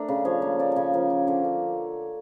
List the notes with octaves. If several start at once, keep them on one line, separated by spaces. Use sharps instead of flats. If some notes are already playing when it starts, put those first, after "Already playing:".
Already playing: A3 D4 A#4
C#3
F3 C#5
A#3 C#5
C#4 D5
C#3 A#4 C#5
F3 A#4
A#3
D3 C#5
D3